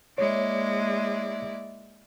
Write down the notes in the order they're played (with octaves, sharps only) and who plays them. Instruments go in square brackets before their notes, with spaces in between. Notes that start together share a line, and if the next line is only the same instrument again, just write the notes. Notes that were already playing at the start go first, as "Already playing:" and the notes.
[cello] G#3 A#3 [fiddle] E4 D5 [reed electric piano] C#5